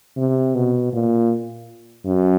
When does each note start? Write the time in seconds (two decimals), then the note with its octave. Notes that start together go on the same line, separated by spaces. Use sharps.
0.17 C3
0.55 B2
0.93 A#2
2.06 F#2